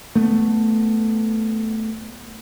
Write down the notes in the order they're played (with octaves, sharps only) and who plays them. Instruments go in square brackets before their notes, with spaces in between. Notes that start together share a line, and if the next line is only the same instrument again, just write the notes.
[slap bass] A3 B3